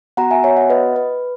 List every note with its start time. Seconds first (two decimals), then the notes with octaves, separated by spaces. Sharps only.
0.17 B3 F#4 F#5 A#5
0.31 E5 G#5
0.44 C#5 E5
0.57 D#5 F#5
0.70 B4 D#5
0.96 B4